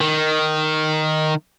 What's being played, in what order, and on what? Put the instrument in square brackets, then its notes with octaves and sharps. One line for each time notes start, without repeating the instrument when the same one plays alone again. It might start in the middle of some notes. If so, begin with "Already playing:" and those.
[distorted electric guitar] D#3